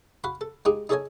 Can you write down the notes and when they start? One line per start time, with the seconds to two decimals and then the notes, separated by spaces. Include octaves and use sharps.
0.24 F#4 F5 F#5 B5
0.41 A4
0.65 G#3 D#4 F4 G4 G#4
0.89 D#4 G#4 A4 C#5 D#5 G#5